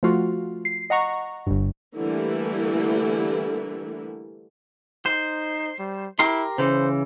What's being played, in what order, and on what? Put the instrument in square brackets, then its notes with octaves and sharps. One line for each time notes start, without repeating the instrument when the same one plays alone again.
[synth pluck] F3 A3 F4 F#4
C7
D#5 F#5 A#5 C#6
G1 G2
[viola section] D3 E3 G3 A3 A#3 E4
[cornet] D#4 [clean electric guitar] C5
[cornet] G3
[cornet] E4 [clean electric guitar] G4 A#4 C6
[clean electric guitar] C#3 E3 [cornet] C5